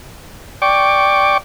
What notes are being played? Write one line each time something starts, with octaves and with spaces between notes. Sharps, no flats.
D5 G5 C#6 D6